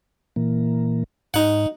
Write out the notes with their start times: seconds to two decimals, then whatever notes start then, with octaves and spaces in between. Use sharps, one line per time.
0.36 A#2 E3 A#3
1.34 G#2 D#4 F#5